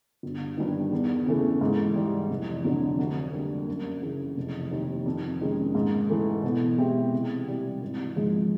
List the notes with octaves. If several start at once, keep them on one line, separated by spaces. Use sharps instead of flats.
G1
G2 D#3
E2
C#3 E3 A3
G#2
E3 G3
F1
F2 D3 F#3
D2
D3 G3 A#3
F#2
C#3 E3
F1
D#2 D#3
F2
C3 D#3 G#3 C#4
G#2
E3 A3
B2
G#3 C4 E4 G4
C3
E3 G3
G#1
G#2 F3 G#3